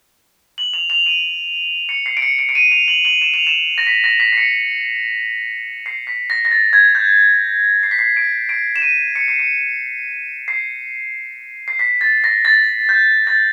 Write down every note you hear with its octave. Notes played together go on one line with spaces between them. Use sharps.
F#7
F7
F7
D#7
C#7
C7
D7
C#7
D7
D7
D#7
F7
F#7
F#7
E7
F7
E7
A#6
B6
A#6
B6
C7
C#7
C7
B6
A#6
A#6
A6
G#6
G6
C7
B6
C7
D7
D7
E7
D#7
C#7
C7
C#7
C7
C7
B6
A6
A#6
A6
G6
A6